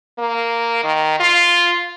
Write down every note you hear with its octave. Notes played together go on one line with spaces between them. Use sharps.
A#3
D#3
F4